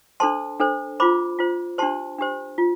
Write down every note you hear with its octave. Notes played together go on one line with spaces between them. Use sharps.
D4 A4 C5 A5 C6
D4 A4 C5
F4 C5 B5 D6
F4 C5
D4 G4 C5 A5 C6
D4 G4 C5
F4